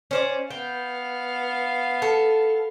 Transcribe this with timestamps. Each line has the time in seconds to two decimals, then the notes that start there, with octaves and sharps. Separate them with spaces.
0.11 C#4 C5 D5
0.50 B3 F5 G5
2.02 A4